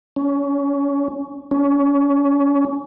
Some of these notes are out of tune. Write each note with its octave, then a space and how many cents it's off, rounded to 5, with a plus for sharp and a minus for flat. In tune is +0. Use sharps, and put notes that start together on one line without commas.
C#4 +25
C#4 +30